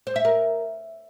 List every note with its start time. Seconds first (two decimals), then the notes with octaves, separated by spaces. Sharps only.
0.07 C5
0.16 E5
0.25 A#4